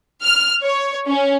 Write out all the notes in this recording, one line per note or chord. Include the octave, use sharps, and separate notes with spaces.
F6
C#5
C#4